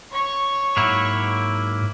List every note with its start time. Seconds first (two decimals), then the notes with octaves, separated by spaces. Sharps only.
0.11 C#5 C#6
0.77 G#2 F#3 A#3 E4